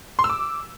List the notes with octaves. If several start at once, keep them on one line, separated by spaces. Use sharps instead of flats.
C6
E6
D6